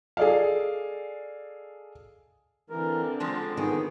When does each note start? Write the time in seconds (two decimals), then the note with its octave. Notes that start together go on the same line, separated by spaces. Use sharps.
0.17 G#4 A4 D5 D#5 F5
2.70 D3 E3 C4 A#4
3.20 C#3 F3 G#3 A5
3.57 D#3 B3 G#4